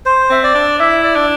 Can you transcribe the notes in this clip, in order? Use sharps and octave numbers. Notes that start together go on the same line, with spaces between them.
C5
C4 E5
D5
D4
E4 E5
D5
D4